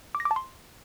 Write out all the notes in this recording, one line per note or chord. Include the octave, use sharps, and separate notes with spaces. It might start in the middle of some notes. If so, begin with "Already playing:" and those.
D6
A#6
D6
A5
C6